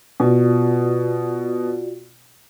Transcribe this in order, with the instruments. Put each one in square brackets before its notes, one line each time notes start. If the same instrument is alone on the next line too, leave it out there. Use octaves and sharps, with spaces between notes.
[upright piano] B2 [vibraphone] F4 F#4 D5